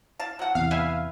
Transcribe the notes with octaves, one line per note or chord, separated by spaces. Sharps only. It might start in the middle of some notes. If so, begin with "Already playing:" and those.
F5 A5
F#3 F#5
E2 C3 F5
B4 E5 G#5